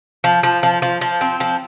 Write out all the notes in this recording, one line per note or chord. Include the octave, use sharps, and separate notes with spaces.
F3
F3
F3
F3
F3
C4
F3